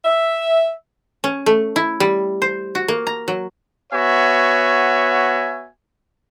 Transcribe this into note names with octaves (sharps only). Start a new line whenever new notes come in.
E5
C#4
A3
E4
G3
C5
F#4
A#3
A#5
F#3
B3 F#4 C#5 E5 G#5